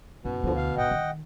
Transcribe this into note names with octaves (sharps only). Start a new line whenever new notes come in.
F#1 B2
D2 D3 F3 E4
F5
A1 D#5 F#5 G5
D#3